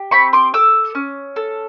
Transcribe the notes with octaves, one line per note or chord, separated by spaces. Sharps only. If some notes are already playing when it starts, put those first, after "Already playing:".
Already playing: G4
C4 B5 C#6
C6 D6
A4 D6 E6
C#4
A4